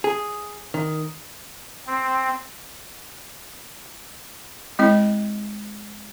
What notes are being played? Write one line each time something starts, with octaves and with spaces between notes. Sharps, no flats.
G#4
D#3
C4
G#3 C4 E4 D#5